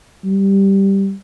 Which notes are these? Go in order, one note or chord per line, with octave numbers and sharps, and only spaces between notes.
G3